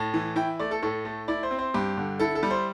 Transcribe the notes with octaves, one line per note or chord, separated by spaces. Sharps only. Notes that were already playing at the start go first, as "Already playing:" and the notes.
Already playing: A2 A5
E3
E4 G5
A3 D5
A4
A2 A4
A3
E4 D5
C5
C4
C5
G2 G4
D3
E4 A4
A4
G3
C5